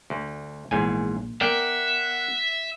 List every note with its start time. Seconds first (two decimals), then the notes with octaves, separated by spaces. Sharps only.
0.10 D2
0.71 A#1 E2 G#2 G#5
1.41 B3 A#4 D5 E5 F#5 G5